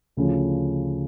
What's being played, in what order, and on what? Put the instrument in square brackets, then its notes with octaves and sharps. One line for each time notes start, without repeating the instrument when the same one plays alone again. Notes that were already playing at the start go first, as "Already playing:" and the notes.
[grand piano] D2 C#3 F3